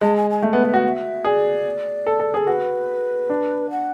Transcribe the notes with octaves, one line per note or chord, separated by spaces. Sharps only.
G#3 A5
G#5
G#5
A3 E5
B3 F#5
B3 E5
F#4 F#5
E5
G#4 D5
A4
A4
G#4
A4
F#4 B4
D4
F#5